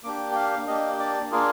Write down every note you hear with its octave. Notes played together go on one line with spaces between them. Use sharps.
A#3 D4 G4 D6
G5
F5
A#3 D4 G4 D#5
D5
A#3 D4 F4 G#4 A#4